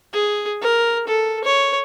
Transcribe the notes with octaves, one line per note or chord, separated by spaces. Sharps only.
G#4
A#4
A4
C#5